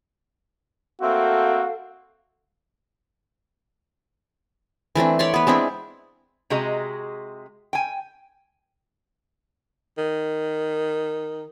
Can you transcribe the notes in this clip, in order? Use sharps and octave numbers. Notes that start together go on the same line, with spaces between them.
A3 A#3 C4 F#4 A4 F5
E3 A3 C4 D4
C#5 D5 B5 C6
B3 B4
G#3 C4 D4 E4
C3 G#3 F#4 G#4 D#5 A#5
G5 G#5
D#3